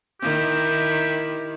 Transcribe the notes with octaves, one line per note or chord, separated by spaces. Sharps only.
D#3 E4 G4